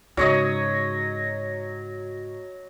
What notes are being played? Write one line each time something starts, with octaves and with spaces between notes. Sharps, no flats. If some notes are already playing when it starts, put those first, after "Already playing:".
G#2 C#3 F#3 C#5 D#5